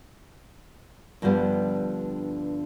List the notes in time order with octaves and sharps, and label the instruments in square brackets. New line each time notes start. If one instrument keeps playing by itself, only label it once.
[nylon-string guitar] G2 D3 F3 G3 B3